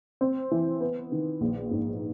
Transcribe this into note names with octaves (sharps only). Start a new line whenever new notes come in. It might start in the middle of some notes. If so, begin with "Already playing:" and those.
C4
E3
B3
D#3
A#1
G#2